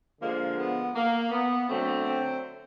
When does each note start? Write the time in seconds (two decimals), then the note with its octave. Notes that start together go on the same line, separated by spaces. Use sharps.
0.21 D3 F3 G#3 A#3
0.58 B3
0.94 A#3
1.31 B3
1.68 D3 F#3 A3 C4
2.05 C4